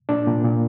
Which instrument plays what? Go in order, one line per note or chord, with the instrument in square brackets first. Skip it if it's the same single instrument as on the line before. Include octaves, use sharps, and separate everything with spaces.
[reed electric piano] A#2 D4
A#2
A#2